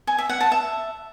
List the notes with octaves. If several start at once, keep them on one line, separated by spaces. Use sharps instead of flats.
G#5
E5
F#5
A5
E5